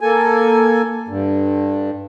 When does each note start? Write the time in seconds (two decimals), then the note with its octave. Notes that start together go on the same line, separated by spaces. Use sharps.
0.01 A#3 A4 G#5
1.08 G2 D3